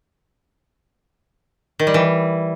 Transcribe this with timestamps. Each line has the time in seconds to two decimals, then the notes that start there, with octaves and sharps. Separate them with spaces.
1.79 D#3
1.87 G3
1.94 E3